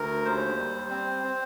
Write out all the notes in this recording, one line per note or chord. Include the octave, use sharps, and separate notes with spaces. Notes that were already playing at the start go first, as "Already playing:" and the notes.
Already playing: D2 A#4
D#2 C5
G3
C4
C4